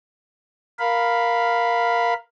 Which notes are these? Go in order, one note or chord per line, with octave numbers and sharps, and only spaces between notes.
A#4 F5 B5